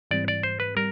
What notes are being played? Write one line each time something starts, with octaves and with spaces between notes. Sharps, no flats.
G#2 E3 G3 C4 D5
D5
C5
B4
G3 A#4